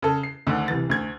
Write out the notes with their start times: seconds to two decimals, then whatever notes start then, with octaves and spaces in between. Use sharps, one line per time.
0.02 C#3 A4
0.23 C7
0.47 D2 D3 D#3
0.68 C2 E3 A6
0.90 D2 G#6